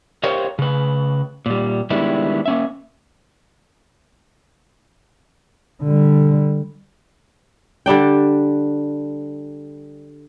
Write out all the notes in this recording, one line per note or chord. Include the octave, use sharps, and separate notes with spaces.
G4 A#4 C5 C#5 F5
C#3 B4
A#2 G3
D#3 G3 G#3 B3 D4 E4
A#3 C#4 E5
D3 G3
D3 G3 D4 G5